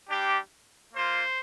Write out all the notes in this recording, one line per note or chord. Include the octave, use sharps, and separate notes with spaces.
G3 D4 G4
A#3 F4 C5